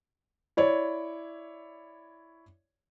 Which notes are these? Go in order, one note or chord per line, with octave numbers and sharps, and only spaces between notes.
E4 C#5 D5